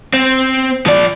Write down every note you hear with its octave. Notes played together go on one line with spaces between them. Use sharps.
C4
F3 D5